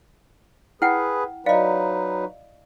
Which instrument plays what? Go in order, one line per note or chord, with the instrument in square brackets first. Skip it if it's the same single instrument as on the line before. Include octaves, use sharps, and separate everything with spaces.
[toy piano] E4 F#5 G5 [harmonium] G#4 B4 [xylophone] F6
[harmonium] F#3 D#4 B4 [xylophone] D5 C#7 [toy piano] D#5 F5